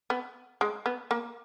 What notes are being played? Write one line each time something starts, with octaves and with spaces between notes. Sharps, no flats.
B3
G#3
B3
A#3